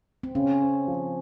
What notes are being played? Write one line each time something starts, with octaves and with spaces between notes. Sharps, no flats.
C4
C#3 C#4
C4
F3